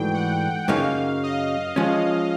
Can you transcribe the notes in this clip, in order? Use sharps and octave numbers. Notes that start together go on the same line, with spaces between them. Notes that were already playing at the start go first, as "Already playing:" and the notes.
Already playing: G#2 E3 A3 D4 F#4 G5
F#5
F#2 C#3 F#3 A#3 D#4 F5
D#5
F3 G#3 C#4